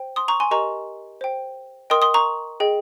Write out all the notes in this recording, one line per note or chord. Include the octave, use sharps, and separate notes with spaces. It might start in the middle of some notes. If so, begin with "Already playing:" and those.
Already playing: C5 G5
C6 D#6
A#5 C#6
G#5 C6
G4 A#4 D#5 A#5 C#6
C5 G5
A#4 D#5 G5 C6 D#6
C6 D#6
A#5 C#6
G#4 D#5 G5